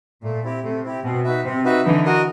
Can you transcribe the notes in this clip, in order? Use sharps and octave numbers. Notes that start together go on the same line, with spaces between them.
A#2 A3
C4 E4 G4
C3 A3
C4 E4 G4
B2 C4
D#4 F#4 B4 E5
C3 C4
D#4 F#4 B4 E5
D3 E3 D#4
F#4 A#4 D#5